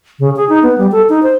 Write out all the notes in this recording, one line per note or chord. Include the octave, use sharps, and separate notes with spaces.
C#3
G#4
D#4
B3
G3
A4
D#4
C5